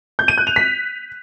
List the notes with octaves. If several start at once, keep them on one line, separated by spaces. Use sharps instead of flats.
G6
D#7
F#6
F7
B6